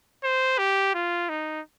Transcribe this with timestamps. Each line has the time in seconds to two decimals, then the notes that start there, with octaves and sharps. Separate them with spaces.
0.24 C5
0.58 G4
0.94 F4
1.29 D#4